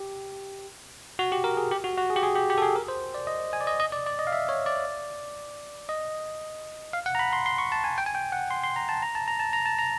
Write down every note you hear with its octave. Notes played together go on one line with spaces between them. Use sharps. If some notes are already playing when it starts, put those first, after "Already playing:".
Already playing: G4
F#4
G4
A#4
G#4
G4
F#4
F#4
G#4
G4
G#4
G4
G4
A4
G#4
A#4
C5
D5
D#5
G#5
D5
D#5
D#5
D5
D5
D#5
F5
E5
C#5
D5
D#5
F5
F#5
A#5
B5
C6
C6
C#6
A5
G#5
G5
G#5
G5
F#5
C6
C6
A#5
A5
A#5
A5
A#5
A5
A#5
A5
A#5